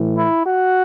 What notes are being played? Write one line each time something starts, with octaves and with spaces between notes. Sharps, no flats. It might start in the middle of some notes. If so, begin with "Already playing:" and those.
Already playing: A2 E3
E4
F#4